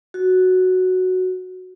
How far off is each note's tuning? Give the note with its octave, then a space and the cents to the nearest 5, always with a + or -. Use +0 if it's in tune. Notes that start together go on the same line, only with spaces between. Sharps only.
F#4 +0